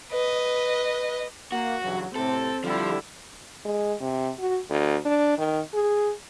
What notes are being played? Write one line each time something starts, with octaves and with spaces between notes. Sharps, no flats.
B4 D#5
A#3 F#4
G2 C#3 E3 F#3
A2 C3 C4 A4
D3 F3 G3 E4
G#3
C3
F#4
D2
D4
D#3
G#4